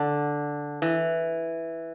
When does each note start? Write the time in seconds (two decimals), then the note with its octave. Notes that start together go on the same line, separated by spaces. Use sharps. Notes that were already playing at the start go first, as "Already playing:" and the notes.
Already playing: D3
0.82 E3